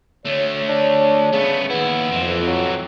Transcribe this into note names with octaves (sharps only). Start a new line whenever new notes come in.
D2 A3 C#5
D4
C#3 A3 B3
D#2 B3 E4
F2 E3 C4
F#3